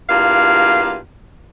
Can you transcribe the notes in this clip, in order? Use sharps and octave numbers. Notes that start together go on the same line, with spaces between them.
E2 G2 A#3 F4 F5